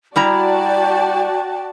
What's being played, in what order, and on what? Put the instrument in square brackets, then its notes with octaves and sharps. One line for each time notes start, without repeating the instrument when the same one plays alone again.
[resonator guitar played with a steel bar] G3 E4 A#5 [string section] F#4 D5 A5 [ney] G5